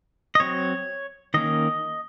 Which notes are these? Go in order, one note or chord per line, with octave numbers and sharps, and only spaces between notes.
D#5
F#3 C4 C#5
D#3 A#3 C#4 D#5